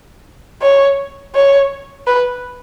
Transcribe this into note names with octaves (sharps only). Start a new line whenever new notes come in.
C#5
C#5
B4